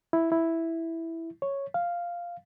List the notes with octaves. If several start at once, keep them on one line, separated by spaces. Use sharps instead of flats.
E4
E4
C#5
F5